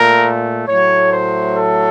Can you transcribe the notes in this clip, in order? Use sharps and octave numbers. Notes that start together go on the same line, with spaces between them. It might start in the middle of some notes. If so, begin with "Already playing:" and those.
Already playing: A#2 A3 A#4
A2 F#3 A3 C#5
C5
A4